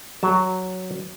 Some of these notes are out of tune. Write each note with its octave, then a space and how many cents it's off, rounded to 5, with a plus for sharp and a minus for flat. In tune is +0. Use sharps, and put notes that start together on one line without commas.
F#3 +0 A5 +0